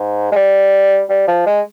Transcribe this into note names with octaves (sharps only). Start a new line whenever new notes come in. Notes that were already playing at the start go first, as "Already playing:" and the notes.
Already playing: G#2
G#3
G3
G3
F3
G#3